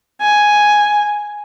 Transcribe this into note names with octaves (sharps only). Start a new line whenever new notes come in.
G#5